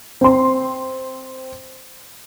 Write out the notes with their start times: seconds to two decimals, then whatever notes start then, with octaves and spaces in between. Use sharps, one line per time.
0.21 C4 C6